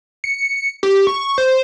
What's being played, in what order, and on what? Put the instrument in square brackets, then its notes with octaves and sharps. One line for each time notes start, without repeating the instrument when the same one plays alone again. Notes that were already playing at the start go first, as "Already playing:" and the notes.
[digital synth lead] C#7
G4
C#6
C5